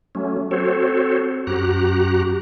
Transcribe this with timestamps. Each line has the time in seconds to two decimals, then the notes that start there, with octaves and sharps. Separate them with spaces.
0.15 F#3 A3 C#4
0.51 C4 F#4 A4 C5 C#5
1.47 F#2 F#4 G4 A#5 F#6